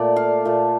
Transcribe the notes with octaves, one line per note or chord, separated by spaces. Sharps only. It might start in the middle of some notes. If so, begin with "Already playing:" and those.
Already playing: A#2 A3 D5
F5
A#2 A3